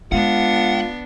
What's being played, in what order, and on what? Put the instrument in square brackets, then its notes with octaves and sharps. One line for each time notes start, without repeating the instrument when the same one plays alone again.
[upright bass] G#3 [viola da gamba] B3 D4 [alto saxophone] F4 [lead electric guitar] F#5